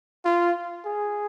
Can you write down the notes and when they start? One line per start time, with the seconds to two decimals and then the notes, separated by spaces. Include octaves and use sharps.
0.25 F4
0.85 G#4